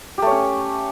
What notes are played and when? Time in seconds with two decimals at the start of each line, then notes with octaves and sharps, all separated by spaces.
0.18 G4
0.22 A3
0.27 C#5
0.31 C#4